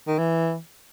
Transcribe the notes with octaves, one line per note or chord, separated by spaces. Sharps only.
D#3
E3